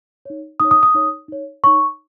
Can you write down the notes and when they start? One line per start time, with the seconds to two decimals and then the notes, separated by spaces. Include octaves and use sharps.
0.25 D#4 C#5
0.60 D#4 C#5 D#6
0.71 D#6
0.83 D#6
0.95 D#4 C#5
1.28 D#4 C#5
1.64 D#4 C#5 C#6